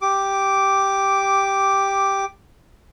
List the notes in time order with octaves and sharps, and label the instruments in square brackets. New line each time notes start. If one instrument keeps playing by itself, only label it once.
[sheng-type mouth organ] G4 D6